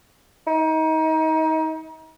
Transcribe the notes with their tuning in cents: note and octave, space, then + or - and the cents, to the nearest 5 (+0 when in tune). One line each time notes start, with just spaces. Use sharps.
D#4 +30